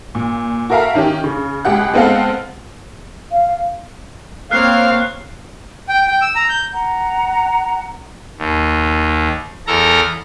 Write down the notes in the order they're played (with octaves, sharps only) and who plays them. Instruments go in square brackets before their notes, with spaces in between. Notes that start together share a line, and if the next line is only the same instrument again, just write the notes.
[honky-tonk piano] A#2
F#4 A4 A#4 E5 F5 A#5
D#3 C#4 G4
C#3
C#2 G4 F#5 F#6
G#3 B3 C4 A4 F5 F#5
[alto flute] F5
[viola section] A#3 C4 C#5 [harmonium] F5 [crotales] F6 F#6 C7
[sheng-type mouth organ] G5
G5
E6
A#5
G6
[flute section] F#5 A#5
[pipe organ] D#2
E2 A4 A#4 A#5